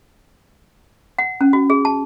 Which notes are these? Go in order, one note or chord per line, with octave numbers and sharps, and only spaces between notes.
F#5
C#4
F#4
G#4
A5